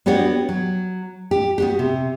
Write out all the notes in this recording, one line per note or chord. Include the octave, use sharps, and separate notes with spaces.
B3 D4 F#4 G4 C#5
F#3
G4
B3 F#4 G4
C3